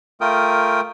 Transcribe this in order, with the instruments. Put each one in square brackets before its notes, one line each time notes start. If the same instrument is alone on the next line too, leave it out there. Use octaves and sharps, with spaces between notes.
[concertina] A3 F4 A#4 G5 D#6